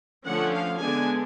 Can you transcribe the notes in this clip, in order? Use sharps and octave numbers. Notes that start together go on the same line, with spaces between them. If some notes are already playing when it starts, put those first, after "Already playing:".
D3 F3 A3 C#4 F#5
F5
D3 G#3 B3 D4 G#5